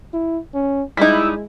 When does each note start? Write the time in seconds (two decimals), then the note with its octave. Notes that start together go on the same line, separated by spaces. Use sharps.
0.13 E4
0.54 C#4
0.97 G3 G#3 D#4 E4